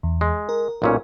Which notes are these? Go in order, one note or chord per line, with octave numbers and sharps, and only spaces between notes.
E2
G#3
A#4
B1 A#2 C#4